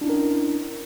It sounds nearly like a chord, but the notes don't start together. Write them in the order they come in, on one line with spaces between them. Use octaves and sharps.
D4 E4 C#4 A#4